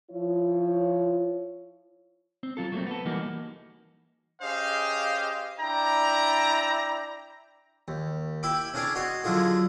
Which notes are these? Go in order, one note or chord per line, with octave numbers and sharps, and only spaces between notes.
F3 E4 F4 C#5
C4
F#3 F4 A4
F#3 A3 A#3 C4
B3 A4
E3 G3 A#3 D#4 F#4
C#4 G4 G#4 C5 D#5 F5
D4 E4 D5 G5 A#5
D#2
E4 E5 G5 B5 D6
C#4 D4 E4 G#4 C#5 D5
F#4 C#5 D#5 C6
D3 F#3 D4 E4 F4 G#4